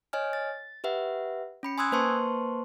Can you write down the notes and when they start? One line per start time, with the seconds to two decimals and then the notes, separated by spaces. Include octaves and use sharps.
0.13 C#5 D#5 G#5 F6
0.33 A6
0.84 G4 B4 E5 F#5
1.63 C#4 B5 C#7
1.78 G#5 C6 D#6 E6 F#6 G#6
1.92 A#3 B4 C5 A5 C6 C#6